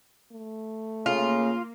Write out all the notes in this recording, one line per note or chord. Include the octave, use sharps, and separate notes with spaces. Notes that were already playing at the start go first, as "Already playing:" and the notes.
A3
C#3 A#3 F4